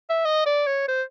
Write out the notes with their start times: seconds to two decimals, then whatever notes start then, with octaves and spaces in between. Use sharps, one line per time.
0.10 E5
0.25 D#5
0.46 D5
0.66 C#5
0.88 C5